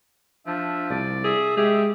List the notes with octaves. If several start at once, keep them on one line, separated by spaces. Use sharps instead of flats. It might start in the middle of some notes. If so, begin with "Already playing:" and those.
F3 D4 E5
C2 D5
G#4 E5
G#3 G4 G#4 E5